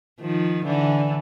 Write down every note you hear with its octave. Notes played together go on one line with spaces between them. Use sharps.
D#3 F3
D3 E3